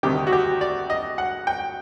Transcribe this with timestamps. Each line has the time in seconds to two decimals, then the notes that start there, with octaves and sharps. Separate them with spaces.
0.03 D2 C3 D#3 G4
0.27 F#4
0.32 G4
0.61 D5
0.90 D#5
1.18 F#5
1.47 G5